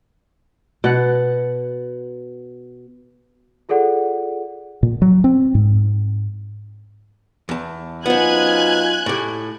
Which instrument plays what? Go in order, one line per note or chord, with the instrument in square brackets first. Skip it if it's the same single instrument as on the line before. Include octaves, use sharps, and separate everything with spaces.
[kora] B2 F#5
[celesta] F4 G#4 A4 D5 F#5
[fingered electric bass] A#2
F#3
C4
G#2
[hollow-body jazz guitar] E2 A5
[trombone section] F#2 D#4 F4 [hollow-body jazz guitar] B3 C5 [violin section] G#5 F#6 G#6
[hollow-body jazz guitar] A2 G4